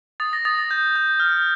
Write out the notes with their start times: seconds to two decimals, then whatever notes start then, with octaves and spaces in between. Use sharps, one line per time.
0.20 D#6 A6
0.33 A#6
0.45 D#6 A6
0.58 A#6
0.71 G6
0.96 G6
1.20 F6